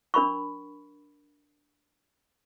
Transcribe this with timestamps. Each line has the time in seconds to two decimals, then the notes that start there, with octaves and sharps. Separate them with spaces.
0.14 D4 A#4 B5 C#6